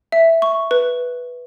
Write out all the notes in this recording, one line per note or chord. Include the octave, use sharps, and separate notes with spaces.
E5
C#6
B4